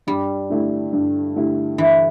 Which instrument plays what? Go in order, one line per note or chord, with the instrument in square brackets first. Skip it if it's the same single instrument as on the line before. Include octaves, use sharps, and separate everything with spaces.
[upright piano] G2 [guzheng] G3
[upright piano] D3 A3 E4 G4
G2
D3 A3 E4 G4
[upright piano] G2 [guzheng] E3